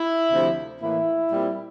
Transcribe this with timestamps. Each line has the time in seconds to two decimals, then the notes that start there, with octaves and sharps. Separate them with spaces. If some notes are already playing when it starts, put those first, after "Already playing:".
Already playing: E4
0.30 D2 C3 F3 C4
0.80 A2 E3 A#3 E4
1.30 A#2 G3 C4